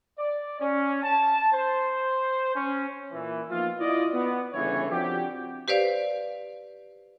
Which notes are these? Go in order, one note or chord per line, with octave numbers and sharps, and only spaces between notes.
D5
C#4
A5
C5
C#4
A#2 E3
F3 A#3 B3 D#4 F4
E4 F4 D5 D#5
B3
G1 C#3 E3 C#5
F3 C4 D4 F#4 G4
G4 B4 C5 D5 F5